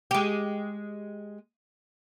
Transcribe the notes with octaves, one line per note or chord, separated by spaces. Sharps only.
G#3 G4